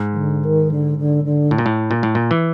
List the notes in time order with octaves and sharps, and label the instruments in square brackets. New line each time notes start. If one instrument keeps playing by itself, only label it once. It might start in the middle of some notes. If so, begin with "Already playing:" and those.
Already playing: [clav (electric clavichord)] G#2
[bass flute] D#3
D3
D#3
D3
D3
D3
[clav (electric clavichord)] A2
A#2
A2
A#2
A2
A#2
E3